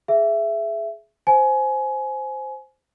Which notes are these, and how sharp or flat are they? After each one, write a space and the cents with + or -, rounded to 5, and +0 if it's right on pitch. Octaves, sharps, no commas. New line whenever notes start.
G#4 +15 E5 +15
C5 +0 G#5 +20